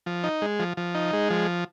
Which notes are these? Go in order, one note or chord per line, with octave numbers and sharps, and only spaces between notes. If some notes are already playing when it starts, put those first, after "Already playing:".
F3
D#4
G#3
F3
F3
D#4
G#3
F3